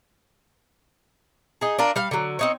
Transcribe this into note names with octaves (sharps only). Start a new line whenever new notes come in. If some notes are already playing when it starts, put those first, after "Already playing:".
D#4 G#4
D4 F4 A#4
G3 F5
D3 F#3
C4 D#4 C#5